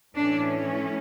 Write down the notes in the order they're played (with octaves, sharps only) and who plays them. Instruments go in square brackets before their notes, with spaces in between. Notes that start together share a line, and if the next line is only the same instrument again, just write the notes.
[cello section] A2 E3 A3 C#4 D4